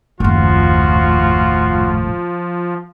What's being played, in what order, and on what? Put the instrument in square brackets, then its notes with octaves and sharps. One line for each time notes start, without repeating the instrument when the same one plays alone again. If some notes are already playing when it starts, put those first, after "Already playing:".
[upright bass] F#1 D#2 [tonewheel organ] A2 [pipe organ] F3 [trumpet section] F4 F#4